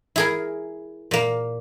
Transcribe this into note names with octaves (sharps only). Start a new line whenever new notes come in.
E4 G#4 A#4
A#2 A#3